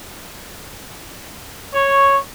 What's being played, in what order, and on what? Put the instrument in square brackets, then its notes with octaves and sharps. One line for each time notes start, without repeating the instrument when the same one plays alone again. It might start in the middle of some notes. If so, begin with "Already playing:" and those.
[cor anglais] C#5 [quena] C#6